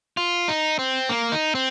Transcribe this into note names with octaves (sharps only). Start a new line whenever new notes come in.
F4
D#4
C4
A#3
D#4
C4